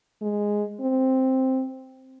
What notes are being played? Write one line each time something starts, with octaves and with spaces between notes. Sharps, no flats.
G#3
C4